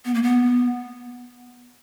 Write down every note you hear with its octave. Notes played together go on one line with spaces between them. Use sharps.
B3
A#3
B3